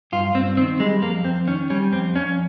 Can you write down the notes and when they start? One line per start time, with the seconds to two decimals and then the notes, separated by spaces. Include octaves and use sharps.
0.12 G2 F4
0.35 G2 C4
0.57 D#3 C4
0.80 G3 G#3
1.02 F2 A#3
1.25 F2 C4
1.47 D#3 C#4
1.70 G3 C#4
1.93 F2 C4
2.15 F2 C#4